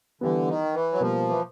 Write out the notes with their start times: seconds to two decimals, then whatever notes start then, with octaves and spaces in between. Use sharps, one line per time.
0.21 D3 E3 G3 B3
0.47 D#3
0.74 E3
0.92 F#3
1.00 B2 F3 G3 A#3
1.29 E3